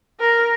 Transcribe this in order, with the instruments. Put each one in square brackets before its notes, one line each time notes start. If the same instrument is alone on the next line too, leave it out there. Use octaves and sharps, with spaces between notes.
[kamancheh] A#4